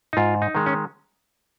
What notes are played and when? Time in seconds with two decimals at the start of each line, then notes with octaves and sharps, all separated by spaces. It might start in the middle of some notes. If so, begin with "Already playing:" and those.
0.13 D#4
0.17 G#2 F4
0.42 D#4
0.55 D#3 G#3
0.66 C#4